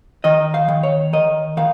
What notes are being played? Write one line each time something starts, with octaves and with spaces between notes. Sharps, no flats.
D#3 D#5
F5
D#3
C#5
D#3 D#5
D#3 F5